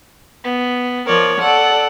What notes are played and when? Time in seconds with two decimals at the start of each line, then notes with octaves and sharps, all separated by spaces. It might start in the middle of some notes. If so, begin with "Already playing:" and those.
0.44 B3
1.06 F3 A#4 C#5 D5
1.40 A4 D5 F#5